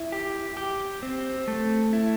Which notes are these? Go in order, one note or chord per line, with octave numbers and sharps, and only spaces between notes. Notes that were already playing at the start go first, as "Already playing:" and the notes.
Already playing: E4
G4
G4
C4
A3
E4